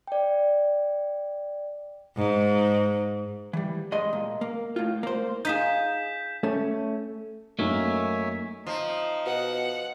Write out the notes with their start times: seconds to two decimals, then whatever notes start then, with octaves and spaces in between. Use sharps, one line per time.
0.07 D5 G5
2.17 G#2
3.53 E3 G3
3.92 G2 G#3 D#5 C6
4.13 A#2
4.41 A#3
4.76 A2 F4
5.03 A#3 C5
5.45 D#4 F4 G#4 G6 B6 E7
6.43 A3 C#4
7.59 F#2 F#3 A3 A#3 D#4 C#5 E5 G#5
8.67 F3 D#4
9.26 B2 F#5